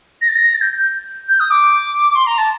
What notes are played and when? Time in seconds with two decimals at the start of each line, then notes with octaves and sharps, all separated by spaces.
0.22 A#6
0.28 A6
0.36 A#6
0.54 A6
0.61 G6
0.78 G6
1.29 G6
1.40 D#6
1.51 D6
2.15 C6
2.27 A#5
2.38 A5